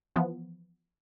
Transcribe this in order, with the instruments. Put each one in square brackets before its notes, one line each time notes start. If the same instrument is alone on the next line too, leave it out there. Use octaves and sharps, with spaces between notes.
[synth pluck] E3 F3 B3